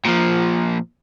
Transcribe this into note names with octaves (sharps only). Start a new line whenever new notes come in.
A#2 F3